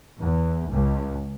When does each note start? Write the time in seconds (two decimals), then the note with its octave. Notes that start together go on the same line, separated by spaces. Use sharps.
0.20 E2
0.71 C#2